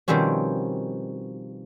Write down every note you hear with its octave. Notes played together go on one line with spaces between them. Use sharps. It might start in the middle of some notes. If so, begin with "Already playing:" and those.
B2 D#3 F3 G3 C4 C#4